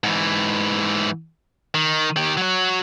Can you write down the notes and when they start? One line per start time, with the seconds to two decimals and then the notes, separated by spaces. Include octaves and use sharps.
0.04 G#2 E3
1.74 D#3
2.16 D#3 G4
2.37 F#3 F#4